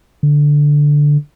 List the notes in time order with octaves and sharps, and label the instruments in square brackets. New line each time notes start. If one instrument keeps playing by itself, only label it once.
[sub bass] D3